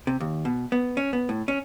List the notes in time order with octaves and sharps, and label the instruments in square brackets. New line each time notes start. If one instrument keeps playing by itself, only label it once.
[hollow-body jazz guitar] C3
D#2
B2
B3
C#4
B3
A2
C#4